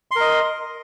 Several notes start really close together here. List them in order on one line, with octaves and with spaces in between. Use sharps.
C6 A#4 D#5